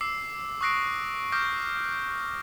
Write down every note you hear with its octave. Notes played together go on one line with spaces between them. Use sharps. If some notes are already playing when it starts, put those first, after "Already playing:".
D6 E6 C7
C#6 D#6 F#6 A#6 C7 D7
D6 D#6 F6 G6 A#6 D7